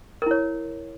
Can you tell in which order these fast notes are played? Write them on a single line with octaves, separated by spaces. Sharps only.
A#4 E4 C#5